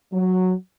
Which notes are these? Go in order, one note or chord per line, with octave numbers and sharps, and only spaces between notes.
F#3